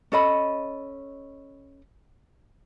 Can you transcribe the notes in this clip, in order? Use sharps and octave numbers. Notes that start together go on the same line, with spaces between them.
C#4 A4 D#5 B5